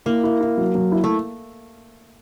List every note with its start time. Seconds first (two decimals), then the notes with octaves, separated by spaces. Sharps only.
0.06 A#3 E4
0.23 E4
0.41 E4
0.58 F#3
0.75 F#3
0.92 E4
1.04 A3